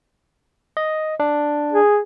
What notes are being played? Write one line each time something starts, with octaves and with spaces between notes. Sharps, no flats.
D#5
D4
G#4